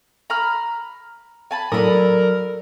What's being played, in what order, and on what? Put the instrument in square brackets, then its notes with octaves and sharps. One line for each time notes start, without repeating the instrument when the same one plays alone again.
[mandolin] A#5 B5 F6
G#5 A5 B5
[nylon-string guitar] F#3 A4 D5 [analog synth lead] A#4 [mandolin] B5 D#6